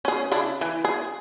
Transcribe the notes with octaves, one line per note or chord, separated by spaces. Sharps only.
C#4 G#4
C#3 D4 E4
E3
G#4